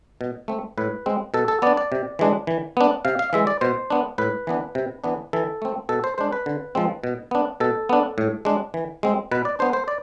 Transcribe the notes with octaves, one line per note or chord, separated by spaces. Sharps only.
B2
A3 C4
A2 B4
G#3 C4
B2 A4
A4
B3 D4 D5
D5
C3
E3 G#3 D4
E3
B3 D4
C3 F5
F5
E3 G#3 E5
D5
B2 C5
B3 D4
A2 B4
E3 B3 D4
C3
E3 B3 D4
E3 A4
A3 C4
B2 A4
C5
G#3 D4 C5
B4
D3
F3 G#3 C4
B2
B3 D4
B2 A4
B3 D4
A2
G#3 D4
E3
G#3 C4
B2 B4
D5
B3 D4 C5
C5
D5